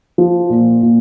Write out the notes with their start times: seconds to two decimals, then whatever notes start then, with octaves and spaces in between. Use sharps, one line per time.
0.18 F3
0.50 A#2
0.83 A#2